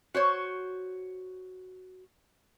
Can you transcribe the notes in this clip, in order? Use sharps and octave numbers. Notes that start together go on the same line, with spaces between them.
F#4 C5 C#5